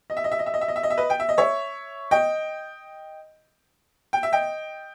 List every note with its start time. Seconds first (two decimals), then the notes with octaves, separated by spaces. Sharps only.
0.10 D#5
0.17 E5
0.24 D#5
0.31 E5
0.39 D#5
0.46 E5
0.54 D#5
0.61 E5
0.68 D#5
0.76 E5
0.83 D#5
0.90 E5
0.97 B4 D#5
1.10 G5
1.20 E5
1.29 D#5
1.38 C#5 E5
2.11 D#5 G5
4.13 G5
4.23 E5
4.33 D#5 G5